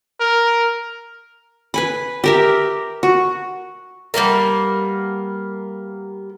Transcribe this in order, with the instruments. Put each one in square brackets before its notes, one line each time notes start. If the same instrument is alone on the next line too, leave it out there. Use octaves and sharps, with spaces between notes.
[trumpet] A#4
[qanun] B4 G#5 B5
G4 A#4 E5
F#4
[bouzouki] G3 A#3 B3 A#4